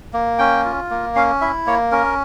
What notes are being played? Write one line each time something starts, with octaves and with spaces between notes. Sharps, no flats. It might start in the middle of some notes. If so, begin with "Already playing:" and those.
A#3
C#4 G5
F4
A#3
C#4 F5
E4 E5
A#3 C#5
C#4 A#4